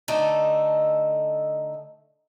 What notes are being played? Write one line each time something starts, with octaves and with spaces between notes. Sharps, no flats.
D3 A3 D#4 A4